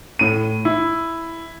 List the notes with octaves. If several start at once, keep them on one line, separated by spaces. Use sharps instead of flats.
A2 D#7
E4